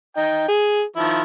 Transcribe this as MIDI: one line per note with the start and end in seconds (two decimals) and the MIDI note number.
0.17 0.46 63
0.17 0.46 79
0.48 0.82 68
0.96 1.23 51
0.96 1.23 53
0.96 1.23 64